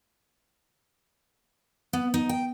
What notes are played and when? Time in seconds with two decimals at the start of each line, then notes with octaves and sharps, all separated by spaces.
1.93 B3
2.14 D#4
2.29 G5